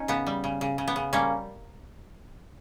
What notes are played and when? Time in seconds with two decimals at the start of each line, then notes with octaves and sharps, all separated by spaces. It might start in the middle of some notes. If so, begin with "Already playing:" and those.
Already playing: C#4 D#4
0.08 C#3 B3
0.27 G3
0.44 C#3
0.61 C#3
0.78 C#3
0.88 B3
0.96 C#3
1.13 G3 A#3 C#4